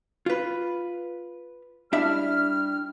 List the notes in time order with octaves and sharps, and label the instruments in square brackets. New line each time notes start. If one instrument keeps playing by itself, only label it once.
[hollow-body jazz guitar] F4 B4
[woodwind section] G3 F6 [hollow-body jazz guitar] D4 E4 E5